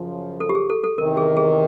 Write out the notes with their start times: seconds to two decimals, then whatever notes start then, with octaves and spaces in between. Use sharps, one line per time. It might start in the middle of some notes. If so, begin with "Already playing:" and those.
Already playing: F#2 C#3 F3
0.40 A4
0.49 G4
0.55 G#4
0.70 A4
0.84 A4
0.98 E2 C3 D#3 A#4
1.17 G#4
1.37 G#4